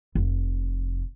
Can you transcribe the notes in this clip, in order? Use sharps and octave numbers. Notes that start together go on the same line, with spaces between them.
F1